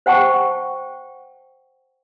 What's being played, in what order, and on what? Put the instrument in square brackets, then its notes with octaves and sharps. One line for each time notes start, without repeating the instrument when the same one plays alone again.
[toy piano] C5 F#5 G5 A5 C#6